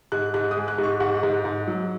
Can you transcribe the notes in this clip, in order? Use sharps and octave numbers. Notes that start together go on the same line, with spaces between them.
G#2 F#6
G#2 F#6
D#6
G#3
F#6
G#2
C#6
G#2 F#5
G#2
G#2
F#3